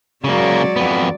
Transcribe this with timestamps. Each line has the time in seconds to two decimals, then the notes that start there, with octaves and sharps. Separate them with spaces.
0.24 C#3 F#3 G#3 A#3 D5
0.76 F2 B3